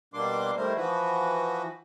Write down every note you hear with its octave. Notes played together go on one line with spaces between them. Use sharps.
B2 G3 A#3 D4 C6 D6
D#3 G3 A3 E4 A#4 C5
E3 F3 F#4 B4